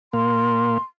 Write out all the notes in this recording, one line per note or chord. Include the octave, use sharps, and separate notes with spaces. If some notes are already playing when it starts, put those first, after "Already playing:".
A#2 A#3 F5 C6